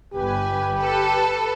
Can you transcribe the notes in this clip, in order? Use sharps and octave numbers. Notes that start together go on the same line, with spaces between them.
G1 G4 B4 G#5
A4 B4